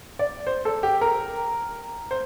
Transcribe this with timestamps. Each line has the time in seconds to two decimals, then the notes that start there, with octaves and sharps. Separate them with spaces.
0.19 D5
0.47 C5
0.65 A4
0.83 G4
1.01 A#4
2.11 C5